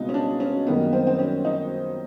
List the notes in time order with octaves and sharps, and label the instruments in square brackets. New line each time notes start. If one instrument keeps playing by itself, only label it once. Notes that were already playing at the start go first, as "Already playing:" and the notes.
Already playing: [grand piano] C#2 B2 G3 C4 [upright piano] D#4
[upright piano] C#4
D4
C#4
[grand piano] F#2 D#3 G3 A#3 [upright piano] B3
[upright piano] C4
C4
C#4
D#4